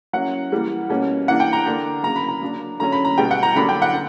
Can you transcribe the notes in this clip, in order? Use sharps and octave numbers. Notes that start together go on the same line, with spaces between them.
F#3 A#3 C#4 E4 F#5
E3 G3 A#3
B2 G3 A#3 C#4
E3 A#3 D4 F#5
G5
A#5
D3 A#3 D4
C#3 F#3 A#3 A#5
B5
A#5
F#3 A#3 D4
D3 F#3 C#4 A#5
B5
A#5
B2 G3 B3 G5
F#5
A#5
D3 F#3 A#3 D4 B5
G5
F#5
D3